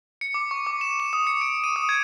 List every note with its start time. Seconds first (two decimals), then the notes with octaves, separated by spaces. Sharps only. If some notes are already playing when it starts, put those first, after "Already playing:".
0.21 C#7
0.34 D6
0.51 C#6
0.67 D6
0.81 E7
1.00 E7
1.13 D#6
1.27 C#7
1.41 D7
1.64 D#7
1.76 D#6
1.89 G#6